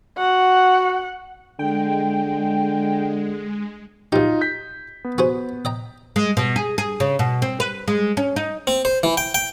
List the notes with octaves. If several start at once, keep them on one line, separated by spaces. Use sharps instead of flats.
F#4 F#5
D3 G#3 G5
B1 D#4 F4 G4
G6 B6
B3
F#4 G#4 C5
D#5 G5 A#5
G#3
B2
G#4
G#4
C#3
B2
C4
B4
G#3
C#4
D#4
C4
C5
E3
G5
G5